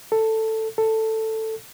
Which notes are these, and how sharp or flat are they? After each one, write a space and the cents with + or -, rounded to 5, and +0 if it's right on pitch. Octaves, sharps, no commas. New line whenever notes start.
A4 +10
A4 +10